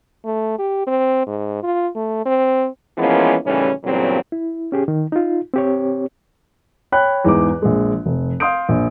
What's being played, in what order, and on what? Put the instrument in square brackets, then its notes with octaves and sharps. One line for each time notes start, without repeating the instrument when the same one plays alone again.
[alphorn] A3
G4
C4
G#2
F4
A3
C4
[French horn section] E3 F3 G#3 A#3 B3 C#4
D#2 A2 C#3 E3 G3 C#4
E2 G2 A#2 C#3 F#3 C4
[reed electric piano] E4
C#4 G4 G#4
D#3
D#4 F4
C4 G4 C#5
[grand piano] C#5 G5 B5 F#6
E2 G#2 D#4 D6
A#1 G#3
F1
F5 C6 D#6 G6 D7
A#1